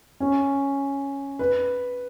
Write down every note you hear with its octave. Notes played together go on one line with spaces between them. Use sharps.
C#4
B4